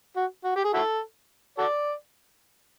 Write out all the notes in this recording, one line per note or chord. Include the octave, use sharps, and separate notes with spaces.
F#4
F#4
G4
G#4
E4 F#4 A4
F#4 A4 D5